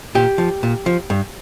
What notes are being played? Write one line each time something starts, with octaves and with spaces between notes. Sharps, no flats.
A#2 G4
F3
A#2
F3
G2